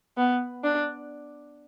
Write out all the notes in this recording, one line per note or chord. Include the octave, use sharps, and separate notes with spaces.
B3
D4